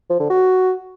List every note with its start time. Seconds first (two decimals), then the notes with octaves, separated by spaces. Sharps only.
0.10 F3
0.20 D3
0.30 F#4